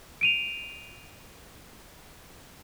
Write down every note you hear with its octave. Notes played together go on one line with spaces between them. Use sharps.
D7 D#7 F7